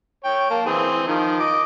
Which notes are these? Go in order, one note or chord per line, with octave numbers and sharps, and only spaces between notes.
C#5 G5
A#3 A5
E3 C4 G#4
D#3 F3
D#5 D6